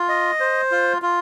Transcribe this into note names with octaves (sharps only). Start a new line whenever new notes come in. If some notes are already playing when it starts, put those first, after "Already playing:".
Already playing: F4
D#5
C5
F4
F4